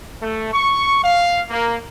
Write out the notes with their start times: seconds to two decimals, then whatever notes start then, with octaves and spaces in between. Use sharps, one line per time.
0.21 A3
0.52 C#6
1.03 F5
1.49 A#3